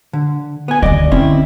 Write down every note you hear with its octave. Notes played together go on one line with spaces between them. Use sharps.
D3
B3 G#5
D2 D#3 D5 D#5
D3 C4 C#4 E4